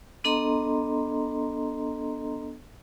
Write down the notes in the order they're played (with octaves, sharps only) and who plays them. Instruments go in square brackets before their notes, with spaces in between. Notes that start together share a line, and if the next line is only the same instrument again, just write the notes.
[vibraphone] B3 D4 A4 D#5 A#5 C6